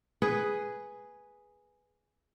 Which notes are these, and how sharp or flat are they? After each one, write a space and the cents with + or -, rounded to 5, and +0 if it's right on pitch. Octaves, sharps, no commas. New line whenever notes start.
G#4 +0 B4 +0